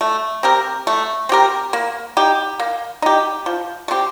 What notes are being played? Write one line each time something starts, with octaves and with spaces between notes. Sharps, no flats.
A3
C4 G4 A#4
A3
C4 G4 A#4
A#3
D#4 G4
A#3
D#4 G4
F3
A3
C4 G4